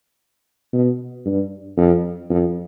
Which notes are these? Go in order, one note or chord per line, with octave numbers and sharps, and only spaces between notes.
B2
G2
F2
F2